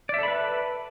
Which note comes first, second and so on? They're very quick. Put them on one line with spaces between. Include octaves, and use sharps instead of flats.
D5 E5 A4 B5 B4